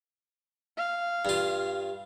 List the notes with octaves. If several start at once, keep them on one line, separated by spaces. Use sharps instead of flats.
F5
G2 F4